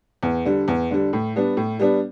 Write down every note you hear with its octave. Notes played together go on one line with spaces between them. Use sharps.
E2
D3 G3
E2
D3 G3
A2
G3 B3 D4
A2
G3 B3 D4